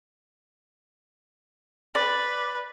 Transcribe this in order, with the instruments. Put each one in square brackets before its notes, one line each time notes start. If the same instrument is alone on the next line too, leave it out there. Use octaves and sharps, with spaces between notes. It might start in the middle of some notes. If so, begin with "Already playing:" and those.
[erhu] B4 [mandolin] D5